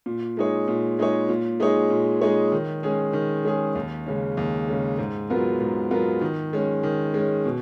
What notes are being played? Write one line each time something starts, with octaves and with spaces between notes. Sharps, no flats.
A#2
G#3 D#4 G#4 C#5
A#2
G#3 D#4 G#4 C#5
A#2
G#3 D#4 G#4 C#5
A#2
G#3 D#4 G#4 C#5
D#3
G#3 C#4 G#4
D#3
G#3 C#4 G#4
D#2
C#3 G#3 C#4
D#2
C#3 G#3 C#4
G#2
F#3 B3 F4 A#4
G#2
F#3 B3 F4 A#4
D#3
G#3 C#4
D#3
G#3 C#4
B2